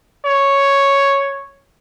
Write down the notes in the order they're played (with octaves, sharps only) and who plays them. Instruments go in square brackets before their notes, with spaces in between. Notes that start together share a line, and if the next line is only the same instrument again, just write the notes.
[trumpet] C#5